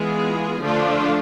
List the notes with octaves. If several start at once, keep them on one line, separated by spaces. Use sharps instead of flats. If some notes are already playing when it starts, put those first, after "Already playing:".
Already playing: E3 G#3 B3 F4 G#4
D3 F3 A3 D4 F4